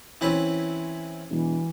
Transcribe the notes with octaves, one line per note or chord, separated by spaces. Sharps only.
E3 C4 C#4 E4 B4
E1 E3